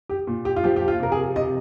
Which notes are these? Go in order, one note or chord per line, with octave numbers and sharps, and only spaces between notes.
G4
A#2
G4
F4
F3 G4
G4
F4
C3 A#4
G#4
C3 D#5